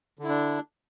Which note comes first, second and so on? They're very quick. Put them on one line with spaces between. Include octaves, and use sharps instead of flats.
D3 E4 D4